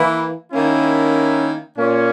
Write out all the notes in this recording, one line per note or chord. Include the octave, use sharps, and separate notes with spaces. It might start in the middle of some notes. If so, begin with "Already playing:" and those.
Already playing: E3 A#3 E4
D#3 A#3 C#4 E4
A#2 A#3 C#4